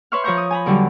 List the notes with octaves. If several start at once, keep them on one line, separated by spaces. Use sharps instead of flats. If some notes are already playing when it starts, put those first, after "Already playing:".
B4 C#5 E5 C6 C#6 F6
F3 C#5 E5 A#5 C#6 G6
D#6
G#5 A#5 B5
E2 D3 F#3 G3